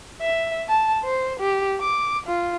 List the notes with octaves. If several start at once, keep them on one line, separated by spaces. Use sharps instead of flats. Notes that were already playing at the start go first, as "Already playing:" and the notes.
E5
A5
C5
G4
D6
F4